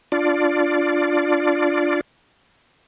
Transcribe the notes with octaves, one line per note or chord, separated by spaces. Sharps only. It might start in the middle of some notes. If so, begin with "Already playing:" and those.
D4 F4 D5